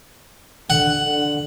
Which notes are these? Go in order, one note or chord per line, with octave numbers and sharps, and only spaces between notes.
D3 F#5
D3